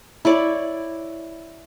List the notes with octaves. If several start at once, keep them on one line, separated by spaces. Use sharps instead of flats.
E4 C#5 D5